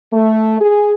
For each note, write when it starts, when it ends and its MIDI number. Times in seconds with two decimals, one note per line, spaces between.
0.13 0.57 57
0.61 0.94 68